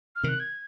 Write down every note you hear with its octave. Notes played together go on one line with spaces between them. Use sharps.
F6
C3 D#3 F#6
G#6